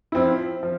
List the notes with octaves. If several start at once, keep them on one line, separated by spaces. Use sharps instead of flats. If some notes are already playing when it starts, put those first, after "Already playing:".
F3 C4 E4
F3